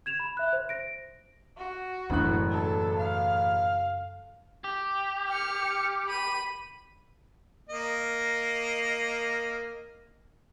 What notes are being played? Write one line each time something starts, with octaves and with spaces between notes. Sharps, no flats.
G#6 E7 F7
B5
E5 F#6
C5
A#6 D7
F#4
E1 F#2 A2 C#3 F#6
A4
F5
G4
F6 C#7
B5 D#7
A#3 D#5